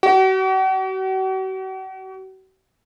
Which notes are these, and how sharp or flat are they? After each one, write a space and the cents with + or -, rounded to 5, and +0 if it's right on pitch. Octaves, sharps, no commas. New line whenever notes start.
F#4 +40